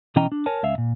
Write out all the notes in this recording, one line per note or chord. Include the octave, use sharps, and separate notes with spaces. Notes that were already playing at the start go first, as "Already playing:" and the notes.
B2 E3 C#4 D#5 G5 A#5
D4
A#4 C#5 G#5 A5
C#2 C#3 E5 F5
A#2